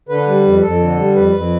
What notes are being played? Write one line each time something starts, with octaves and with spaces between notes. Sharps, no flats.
D3 B4
G3
F2
F2 A4
D3
G3
F2 B4
F2